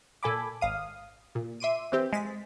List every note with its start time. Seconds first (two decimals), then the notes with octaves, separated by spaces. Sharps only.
0.23 A#2 A4 G#5 B5 D6
0.61 G#1 F5 D#6
1.35 A#2
1.60 E5 C6 D6 D#7
1.92 E3 C4 G4
2.13 G#3 A6 B6